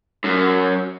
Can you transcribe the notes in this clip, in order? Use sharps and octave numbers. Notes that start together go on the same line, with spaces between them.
F#2